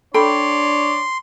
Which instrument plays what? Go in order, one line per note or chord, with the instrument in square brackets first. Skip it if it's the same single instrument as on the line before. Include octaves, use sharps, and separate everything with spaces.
[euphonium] D4 [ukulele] A4 G5 B5 [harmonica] C#5 D5 [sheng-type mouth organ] C6